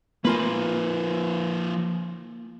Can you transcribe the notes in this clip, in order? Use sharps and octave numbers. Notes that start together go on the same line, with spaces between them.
F3 A#3 F4 B4 G#5